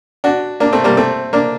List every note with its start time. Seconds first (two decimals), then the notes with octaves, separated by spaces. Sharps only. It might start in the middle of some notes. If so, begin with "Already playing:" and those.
0.24 D4 F#4
0.60 A#3 D4
0.73 A3 C4
0.84 G3 A#3
0.97 A3 C4
1.33 A#3 D4